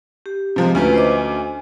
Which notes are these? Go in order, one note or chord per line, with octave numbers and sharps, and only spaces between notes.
G4
C3 F3 G#3
D2 C#4 F4 B4
C5 D#5 D6
G#5